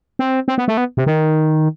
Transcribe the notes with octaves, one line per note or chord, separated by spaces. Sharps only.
C4
C4
B3
A3
B3
C3
D#3